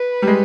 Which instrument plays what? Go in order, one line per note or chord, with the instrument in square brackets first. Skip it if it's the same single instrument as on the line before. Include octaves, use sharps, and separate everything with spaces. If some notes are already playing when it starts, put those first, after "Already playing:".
Already playing: [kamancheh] B4
[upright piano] G3
G#3